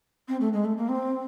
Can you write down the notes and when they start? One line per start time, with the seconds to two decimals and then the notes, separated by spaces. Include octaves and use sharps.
0.28 C4
0.41 A3
0.53 G#3
0.65 A3
0.77 A#3
0.89 C4